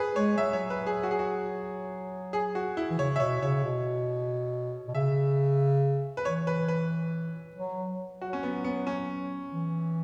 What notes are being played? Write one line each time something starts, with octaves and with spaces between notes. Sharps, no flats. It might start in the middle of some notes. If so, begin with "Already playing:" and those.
Already playing: G#4 B4
G#3 C#5
F#3 E5
C#5
B4
G#4
F#4
G#4
F#4
G#4
F#4
E4
E3
C#3 C#5
E5
B2 C#5
C#3 C#5
B2
B2
C#3 E5
B4
E3 C#5
B4
B4
F#3
F#3 F#4
C#4
B3
B3
C#4
E3